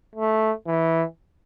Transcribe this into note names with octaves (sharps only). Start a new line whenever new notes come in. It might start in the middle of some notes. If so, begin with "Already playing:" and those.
A3
E3